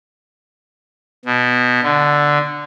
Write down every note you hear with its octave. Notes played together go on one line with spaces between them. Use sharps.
B2
D3